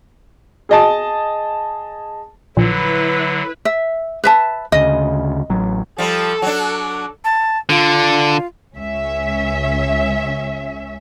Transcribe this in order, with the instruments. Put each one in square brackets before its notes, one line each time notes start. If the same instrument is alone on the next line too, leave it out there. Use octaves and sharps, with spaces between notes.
[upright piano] G#4 D#5 A5
[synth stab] A#1 [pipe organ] D3 F#3 [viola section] E4 B4
[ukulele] E5
B4 E5 A5
[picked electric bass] D2 C#3 [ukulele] D#5
[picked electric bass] A1 F#3
[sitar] F3 G3 [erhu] A4
[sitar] F#3 D4
[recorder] A5
[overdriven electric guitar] D3 [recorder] F4
[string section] C#2 C#4 E5